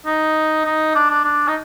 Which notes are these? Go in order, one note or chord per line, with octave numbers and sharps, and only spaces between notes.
D#4
D#4
D4
D4
D4
D#4